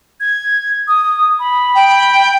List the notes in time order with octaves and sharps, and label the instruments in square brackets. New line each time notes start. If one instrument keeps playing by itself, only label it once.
[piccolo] G#6
D#6
B5
[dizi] G5